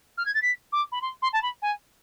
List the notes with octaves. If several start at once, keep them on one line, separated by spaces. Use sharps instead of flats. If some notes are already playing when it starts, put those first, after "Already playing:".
F6
G#6
A6
B6
D6
B5
C6
C6
A5
B5
G#5